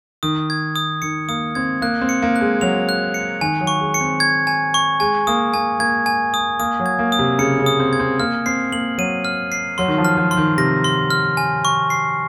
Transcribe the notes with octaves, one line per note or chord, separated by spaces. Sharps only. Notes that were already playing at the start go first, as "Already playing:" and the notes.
D#3 D#6
G#6
D#6
D#3 C#7
A#3 D#6
C4 G#6
A#3 F#6
C4
C#7
A#3
F#6
G#3
F#3 F7
F#6
C#7
D#3 G#5
F#3
C#6
G#3
C#7
C4
G#6
G#5
C#6
G#3 G#5
A#3 D#6
A#3 G#5
A#3 G#6
G#5
D#6
A#3 D#6
F#3
G#6
A#3
D#6
C3
C#3 C#7
C#3
D#6
C4
G#6
C4
A#3 F6
C4 C7
A#3 F#7
F#3 D#7
F6
C7
F#3 C6
D#3
F3
F6
F3
C6
D#3
C3 A#6
C6
F6
G#5
C#6
C7